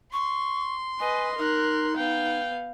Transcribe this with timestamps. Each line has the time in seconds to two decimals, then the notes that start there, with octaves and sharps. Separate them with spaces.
0.13 C6 C#6
1.00 B4 D#5 G#5
1.38 D#4 A#4 F#6
1.97 B3 F5 G5